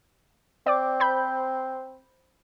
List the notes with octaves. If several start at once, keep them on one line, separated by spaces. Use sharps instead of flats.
C4 D5 D6
C5 B5 G6